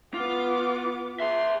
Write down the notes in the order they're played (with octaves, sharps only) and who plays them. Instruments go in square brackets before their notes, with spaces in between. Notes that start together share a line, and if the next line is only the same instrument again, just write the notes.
[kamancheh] B3 D6 [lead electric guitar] F4
[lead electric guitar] G#4 E5 [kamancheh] C6